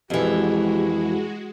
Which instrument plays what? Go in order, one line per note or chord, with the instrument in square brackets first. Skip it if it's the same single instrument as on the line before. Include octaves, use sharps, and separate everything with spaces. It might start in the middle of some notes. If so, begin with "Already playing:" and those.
[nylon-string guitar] F2 E3 [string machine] G#3 F#4 [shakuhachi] G4